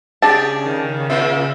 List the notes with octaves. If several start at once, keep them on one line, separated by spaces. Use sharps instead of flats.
C#3 D4 G4 G#4 D5 A5
D#3
A#2 C4 F4 E5